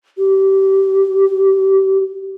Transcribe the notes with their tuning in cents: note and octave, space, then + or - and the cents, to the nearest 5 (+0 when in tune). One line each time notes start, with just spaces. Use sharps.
G4 -25